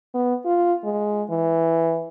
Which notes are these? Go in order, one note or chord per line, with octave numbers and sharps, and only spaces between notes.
B3
F4
G#3
E3